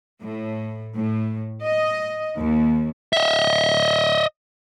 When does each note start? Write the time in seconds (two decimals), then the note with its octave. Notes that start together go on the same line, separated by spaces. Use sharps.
0.21 A2
0.98 A2
1.62 D#5
2.37 D#2
3.13 D#5 E5